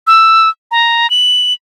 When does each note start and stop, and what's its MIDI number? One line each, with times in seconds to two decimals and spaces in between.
0.07 0.49 88
0.71 1.10 82
1.10 1.53 102